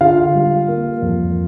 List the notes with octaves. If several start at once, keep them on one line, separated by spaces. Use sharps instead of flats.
D3 F4 F5
G3
A#3
F2